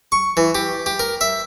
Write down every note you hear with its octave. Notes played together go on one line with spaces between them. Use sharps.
C#6
E3
G4
G4
A#4
E5